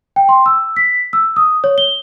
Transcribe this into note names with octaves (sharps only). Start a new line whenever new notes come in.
G5
C6
E6
B6
E6
D#6
C#5
G7